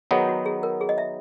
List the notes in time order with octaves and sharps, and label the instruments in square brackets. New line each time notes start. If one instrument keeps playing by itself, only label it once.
[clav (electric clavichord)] D#3 F#3 B3 D#4 [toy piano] G#4
[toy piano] F#4
G#4
A#4
G#4
D#5
E5